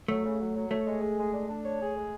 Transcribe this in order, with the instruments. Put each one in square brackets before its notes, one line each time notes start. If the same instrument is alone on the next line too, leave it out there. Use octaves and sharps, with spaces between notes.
[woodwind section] F#3 [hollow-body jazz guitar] A3
[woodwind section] C#3
F#3
F#3
[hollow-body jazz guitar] A3 [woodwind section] C#5
[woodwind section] G#3
G#4
G#3
D4
D4
C#5
G#4
G#3